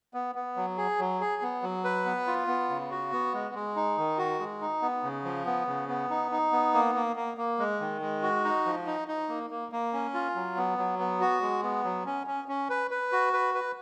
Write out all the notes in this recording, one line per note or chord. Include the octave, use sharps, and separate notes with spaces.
B3
B3
F#3
G#4
F#3
G#4
B3
F#3
B4
B3
F4
B3
C#3
F#4
B3
G#3
G#3
D#4
D#3
F#4
G#3
D#4
B3
C#3
F3
B3
C#3
B3
D#4
D#4
B3
A#3
A#3
A#3
A#3
G#3
D#3
G#3
F#4
D#4
F3
D#4
D#4
A#3
A#3
A#3
C#4
F4
F#3
B3
F#3
B3
F#4
G#3
B3
F#3
C#4
C#4
C#4
B4
B4
F#4
B4
B4